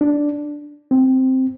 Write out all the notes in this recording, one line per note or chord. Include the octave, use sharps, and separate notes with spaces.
D4
C4